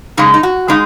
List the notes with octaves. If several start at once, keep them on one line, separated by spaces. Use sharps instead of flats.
F#2 C#3 G#3 D#4
D#4
F#4
C#3 G#3 D#4